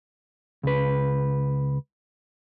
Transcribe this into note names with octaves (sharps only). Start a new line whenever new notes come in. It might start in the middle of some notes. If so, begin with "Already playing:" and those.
C#2 B4